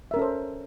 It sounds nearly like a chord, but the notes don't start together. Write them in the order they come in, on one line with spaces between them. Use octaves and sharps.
E5 A#4 C#4 A4 C5